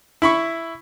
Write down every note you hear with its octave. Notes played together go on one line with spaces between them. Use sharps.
E4 B5 C#6